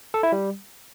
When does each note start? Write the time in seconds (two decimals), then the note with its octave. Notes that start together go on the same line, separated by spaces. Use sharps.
0.14 A4
0.23 E4
0.32 G3